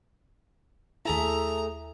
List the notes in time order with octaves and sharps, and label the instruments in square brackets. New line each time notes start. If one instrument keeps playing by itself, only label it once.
[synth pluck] D#2 E4 [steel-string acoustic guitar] A3 G#4 A4 [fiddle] A#5